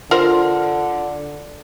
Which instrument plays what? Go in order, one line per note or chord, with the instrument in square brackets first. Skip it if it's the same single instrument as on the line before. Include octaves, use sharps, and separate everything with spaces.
[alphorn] D3 [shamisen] F4 A#4 C5